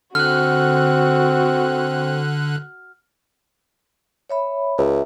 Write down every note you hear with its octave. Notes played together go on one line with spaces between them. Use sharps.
D3 C4 F#4 F6 F#6
C#5 E5 B5
C#2 E5